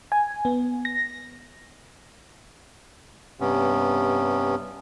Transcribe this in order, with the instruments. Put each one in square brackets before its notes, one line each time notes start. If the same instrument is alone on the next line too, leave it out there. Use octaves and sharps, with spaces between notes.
[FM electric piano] G#5
B3
A#6
[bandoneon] G2 C3 B3 C#4